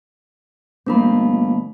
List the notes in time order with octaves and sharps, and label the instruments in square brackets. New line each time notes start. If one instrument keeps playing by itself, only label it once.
[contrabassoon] G1 [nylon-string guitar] F3 A#3 C4 [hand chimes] A3 D4 B5